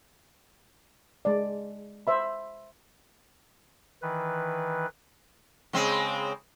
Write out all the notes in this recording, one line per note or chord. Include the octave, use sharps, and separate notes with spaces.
G#3 D5
C5 E5 B5
D#3 E3 B4
C#3 G#3 C4